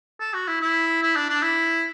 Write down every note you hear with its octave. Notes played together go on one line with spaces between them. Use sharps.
A4
F#4
E4
E4
E4
D4
D4
E4